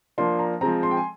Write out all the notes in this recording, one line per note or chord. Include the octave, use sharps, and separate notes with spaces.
F3 A#3 D4 C6
A#5
F3 G#3 C4 A#5
C6
G5
G#5